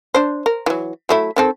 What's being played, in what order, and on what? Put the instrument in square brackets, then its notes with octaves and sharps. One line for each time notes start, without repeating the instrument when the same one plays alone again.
[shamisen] D4 C5
A#4
E3 F#3
F#3 A3 E4
D#3 C4 A4